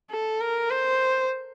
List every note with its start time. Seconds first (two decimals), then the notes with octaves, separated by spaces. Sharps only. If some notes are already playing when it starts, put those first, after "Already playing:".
0.11 A4
0.41 A#4
0.70 C5